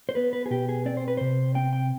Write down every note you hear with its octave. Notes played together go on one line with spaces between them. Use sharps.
C5
B3 B4
B4
G#4
B2 G4
G#4
C4 D5
C5
B4
C3 C5
C4 G5
G5